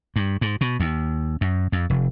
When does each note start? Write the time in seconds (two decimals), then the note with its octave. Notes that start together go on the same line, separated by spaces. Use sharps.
0.16 G2
0.41 G#2
0.61 B2
0.80 D#2
1.41 F#2
1.72 F2
1.90 F1